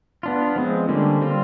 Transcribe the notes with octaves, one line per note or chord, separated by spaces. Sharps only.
B3 D4 F4
F3 G#3 C4
D3 G3 A#3 C#4
G3 C4 F4